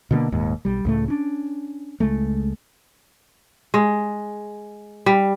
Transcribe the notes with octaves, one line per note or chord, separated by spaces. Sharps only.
B2 D3 G#3 A#3
D#1 D#2 G#2
B1 G3
C#2 A2 A3
C#4 D4
C#2 G#3 A3
G#3
G3